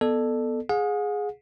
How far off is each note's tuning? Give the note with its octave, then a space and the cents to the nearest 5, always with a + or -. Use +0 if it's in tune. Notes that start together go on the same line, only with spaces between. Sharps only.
B3 +0 A4 +0 D5 +40
G#4 +0 F#5 -45